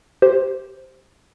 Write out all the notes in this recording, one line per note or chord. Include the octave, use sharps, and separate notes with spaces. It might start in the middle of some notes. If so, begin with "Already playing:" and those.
G4 C5